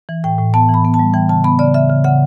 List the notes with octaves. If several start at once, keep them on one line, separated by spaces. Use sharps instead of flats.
E3
A2 G5
A2
B3 A5
E3
B5
B3
A5
G3
E3 G5
C#3 A5
B3 B5
C#3 D5
C#3 E5
C#3
C#3 F#5